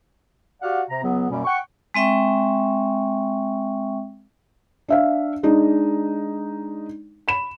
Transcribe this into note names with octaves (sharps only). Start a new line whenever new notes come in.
F#4 G4 D5 F5 F#5
C3 A#5
C#2 F#3 B3
F#2 B2 G3 A#3 C#4
F#5 G5 C#6
G#3 C4 E5 G5 C#6
D4 E5 F5
G#3 D4 D#4
B5 E7